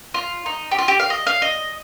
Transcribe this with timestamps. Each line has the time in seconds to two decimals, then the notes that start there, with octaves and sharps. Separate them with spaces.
0.14 F4
0.46 D#4
0.71 G4
0.78 F4
0.88 G4
1.00 F5
1.10 D#5
1.27 F5
1.42 D#5